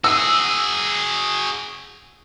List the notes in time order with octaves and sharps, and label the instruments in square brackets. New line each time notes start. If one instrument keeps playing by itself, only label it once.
[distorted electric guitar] F#4 G#4 [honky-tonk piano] E6